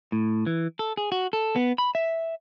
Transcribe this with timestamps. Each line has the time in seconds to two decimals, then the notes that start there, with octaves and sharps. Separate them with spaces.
0.12 A2
0.47 E3
0.79 A4
0.97 G#4
1.12 F#4
1.33 A4
1.56 B3
1.78 B5
1.95 E5